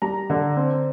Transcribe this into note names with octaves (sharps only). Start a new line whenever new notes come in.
G3 A#5
D3
C4